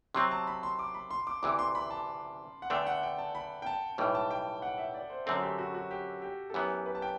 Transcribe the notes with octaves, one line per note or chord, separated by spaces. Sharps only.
C3 F#3 C4 C6
A5
B5
C6
D6
B5
C6
D6
D2 C3 E3 D6
C6
B5
A5
F#5
E2 D3 A3 D4 G5
F#5
G5
A5
B5
G5
A5
B1 A2 E3 G3 G5
A5
G5
F#5
E5
D5
C5
F#2 D3 A3 C4 A4
F#4
G4
F#4
F#4
G4
G4
A4
F#2 E3 B3 G4
B4
A5
G5